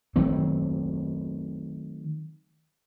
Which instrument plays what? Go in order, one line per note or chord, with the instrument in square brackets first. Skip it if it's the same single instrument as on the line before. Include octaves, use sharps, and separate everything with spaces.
[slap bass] D#3 F#3 A3 C4